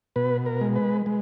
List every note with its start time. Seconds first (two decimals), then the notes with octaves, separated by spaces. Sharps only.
0.16 B2 B4
0.46 A#4
0.61 G#3
0.76 B4
1.06 G#3